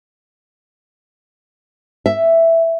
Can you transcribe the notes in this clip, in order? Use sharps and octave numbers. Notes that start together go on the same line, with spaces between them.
E5